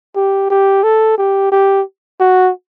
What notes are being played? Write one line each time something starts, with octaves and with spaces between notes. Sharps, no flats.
G4
G4
A4
G4
G4
F#4